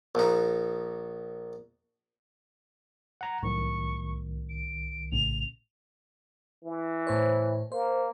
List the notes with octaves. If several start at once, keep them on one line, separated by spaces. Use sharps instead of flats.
A#1 D#4
F#5 A#5
C2 A2 D#3 F#3 C#6
D7
A#1 A2 C#3 F7
E3
A2 C5 C#5
A#3 C5